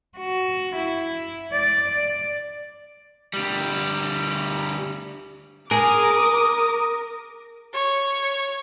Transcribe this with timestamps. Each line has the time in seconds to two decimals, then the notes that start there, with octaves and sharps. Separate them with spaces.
0.17 F#4
0.76 E4
1.51 D5
1.88 D5
3.34 D2 G3
5.71 G#4 A#4 D6 D#6
7.74 C#5